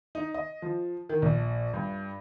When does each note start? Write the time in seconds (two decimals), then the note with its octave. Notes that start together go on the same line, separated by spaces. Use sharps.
0.15 D#4
0.34 D#5
0.62 F3
1.09 D#3
1.22 A#1
1.74 G2